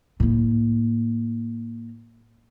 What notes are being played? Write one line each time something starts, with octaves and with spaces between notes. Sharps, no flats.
A2 A#3